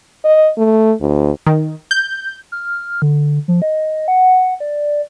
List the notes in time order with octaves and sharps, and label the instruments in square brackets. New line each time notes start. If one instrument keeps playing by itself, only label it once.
[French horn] D#5
A3
D2
[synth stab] D#3
G6
[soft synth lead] F6
D3
F3
D#5
F#5
D5